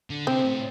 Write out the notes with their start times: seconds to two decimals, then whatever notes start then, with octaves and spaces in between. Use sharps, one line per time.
0.10 D3
0.27 C3 C4
0.44 A2